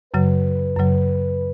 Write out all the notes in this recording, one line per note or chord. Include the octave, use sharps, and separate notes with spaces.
F#2 C#3 F#3 B4
F#2 C#3 F#3